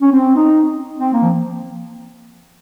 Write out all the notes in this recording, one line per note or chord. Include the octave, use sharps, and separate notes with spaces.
C#4
C4
D#4
C4
A#3
F3